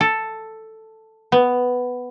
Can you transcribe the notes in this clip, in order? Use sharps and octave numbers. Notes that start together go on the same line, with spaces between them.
A4
B3